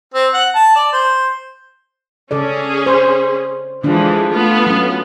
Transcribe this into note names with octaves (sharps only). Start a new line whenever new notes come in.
C4
F#5
A5
D5
C5
C#3 C#4 G#4 A4 D5
C5
D3 E3 F3 G#3 D4
A3 B3 F4
F#3 C#4